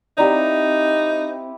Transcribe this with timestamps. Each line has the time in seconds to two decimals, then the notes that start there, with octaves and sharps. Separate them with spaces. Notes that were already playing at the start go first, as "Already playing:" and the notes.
0.18 C4 D#4 E4 G4 D5 F5 A#5